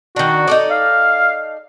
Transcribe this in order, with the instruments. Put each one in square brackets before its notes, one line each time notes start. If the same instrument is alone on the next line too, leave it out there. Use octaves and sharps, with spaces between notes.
[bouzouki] D#3 D4 [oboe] F#4
[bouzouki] D#4 A4 D5
[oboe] F5